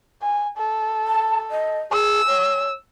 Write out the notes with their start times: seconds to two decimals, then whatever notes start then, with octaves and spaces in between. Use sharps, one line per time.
0.22 G#5
0.58 A4
1.08 A5
1.51 D#5
1.92 G#4 E6
2.27 C#5